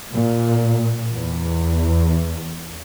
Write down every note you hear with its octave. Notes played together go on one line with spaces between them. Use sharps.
A#2
E2